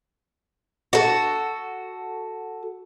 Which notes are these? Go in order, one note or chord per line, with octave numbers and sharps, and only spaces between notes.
F#4 A4